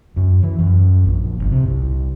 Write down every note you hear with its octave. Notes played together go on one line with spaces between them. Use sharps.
F#2
E3
F#2
A#1
G1
C3
C2